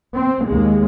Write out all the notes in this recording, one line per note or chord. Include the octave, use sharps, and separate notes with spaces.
C4
D#2 G#3